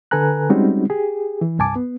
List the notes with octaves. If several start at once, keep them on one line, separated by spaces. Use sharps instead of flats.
D3 A4 B4 G#5 A#5 F#6
G3 G#3 C4 C#4 D#4 F#4
G4 G#4
E3
C2 G2 G#5 A5 D6
B3